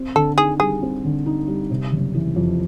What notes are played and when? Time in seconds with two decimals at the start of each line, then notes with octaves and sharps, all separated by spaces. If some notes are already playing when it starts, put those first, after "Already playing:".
Already playing: C4
0.15 D3 A4
0.38 D#4 G#4
0.60 G3 G#4
0.82 C4
1.04 D3
1.26 D#4
1.47 G3
1.71 C3
1.92 F#1
2.15 E3
2.36 F2